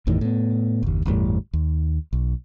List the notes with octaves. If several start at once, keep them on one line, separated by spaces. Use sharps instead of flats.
G1 E2 A2 D#3
A2 B3
F#1 D#2
G1 E2 A2 G3
D#2
B1